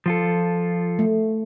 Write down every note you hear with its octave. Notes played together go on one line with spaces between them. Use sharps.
F3 F4 A4
A3